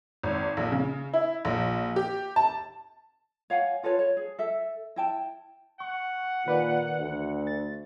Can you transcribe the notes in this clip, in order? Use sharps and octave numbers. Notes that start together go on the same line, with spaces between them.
G#1
A#1
C#3
E4
A#1
G4
A5
C#5 F5 F#5 G#5
F4 A4 B4 C#5
C#5
G#4
A4 E5
E4 G5 A5
F#5 C#6
A#2 D#3 B4 D5
D2
A6